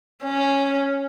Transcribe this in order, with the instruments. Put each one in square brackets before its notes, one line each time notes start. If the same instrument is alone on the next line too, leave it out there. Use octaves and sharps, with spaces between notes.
[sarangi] C#4